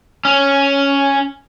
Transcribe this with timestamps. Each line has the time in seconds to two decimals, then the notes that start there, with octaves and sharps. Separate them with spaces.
0.25 C#4